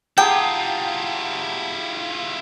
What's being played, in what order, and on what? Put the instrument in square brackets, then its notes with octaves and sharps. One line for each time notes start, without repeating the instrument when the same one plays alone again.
[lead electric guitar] E4 F4 [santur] G4 G#4 [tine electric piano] F#5 A5 A#5 [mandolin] G5